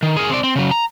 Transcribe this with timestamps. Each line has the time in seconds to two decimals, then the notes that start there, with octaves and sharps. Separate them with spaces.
0.03 D#3
0.17 G#4 A#4
0.30 C4 D5
0.44 C4
0.56 C#3 F#3
0.71 A#5